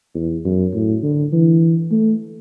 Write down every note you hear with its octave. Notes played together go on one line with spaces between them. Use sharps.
E2
F#2
A2
D3
E3
A3